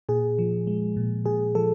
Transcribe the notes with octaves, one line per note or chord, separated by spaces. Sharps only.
A#2 G#4
F3
G#3
A#2
A#2 G#4
F3 A4